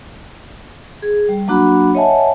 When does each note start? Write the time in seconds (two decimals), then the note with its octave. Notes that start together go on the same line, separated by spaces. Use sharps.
1.02 G#4
1.29 G3
1.48 F#3 A#3 D4 F#4 F#5 B5
1.95 C#5 D#5 E5 F#5 G#5 A5